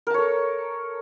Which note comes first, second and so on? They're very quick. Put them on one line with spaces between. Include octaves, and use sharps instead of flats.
A#4 A5 C#5 A4